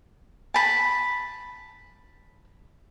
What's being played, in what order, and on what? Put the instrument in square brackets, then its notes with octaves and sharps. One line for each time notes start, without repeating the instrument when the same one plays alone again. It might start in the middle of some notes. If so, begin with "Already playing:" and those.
[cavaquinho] A5 B5